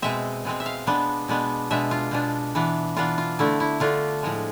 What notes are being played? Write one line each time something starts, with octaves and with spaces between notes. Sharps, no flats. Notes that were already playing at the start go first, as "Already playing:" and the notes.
B2 G#3 C4 E5
B2 G#3 C4
E5
F5
B2 G#3 B3 D4
B2 G#3 B3 D4
B2 G#3 D4 E5
F4
B2 G#3 D4
E3 B3 D4
E3 B3 D4 F4
F4
D3 A3 D4 E4
E4
D3 A3 D4 F4
A2 F3 G#3